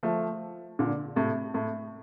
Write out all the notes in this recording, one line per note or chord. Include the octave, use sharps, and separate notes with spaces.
F3 A3
A#2 D3
A2 C3
A2